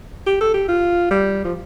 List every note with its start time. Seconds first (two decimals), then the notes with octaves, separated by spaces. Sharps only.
0.27 G4
0.41 A4
0.54 G4
0.68 F4
1.11 G3
1.45 F3